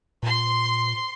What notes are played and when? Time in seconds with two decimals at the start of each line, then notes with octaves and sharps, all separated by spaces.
0.23 A#2 C6